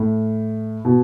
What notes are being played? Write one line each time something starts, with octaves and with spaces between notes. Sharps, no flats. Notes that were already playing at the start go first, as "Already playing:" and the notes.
Already playing: A2
B2